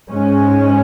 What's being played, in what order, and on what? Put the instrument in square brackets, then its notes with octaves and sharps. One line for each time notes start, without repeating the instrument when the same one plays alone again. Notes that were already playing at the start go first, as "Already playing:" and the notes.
[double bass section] G#2 G#3 C#4